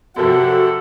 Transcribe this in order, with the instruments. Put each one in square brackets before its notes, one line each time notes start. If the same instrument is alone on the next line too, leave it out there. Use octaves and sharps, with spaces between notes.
[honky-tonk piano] F#2 C3 F3 [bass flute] F#4 [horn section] A4 F#5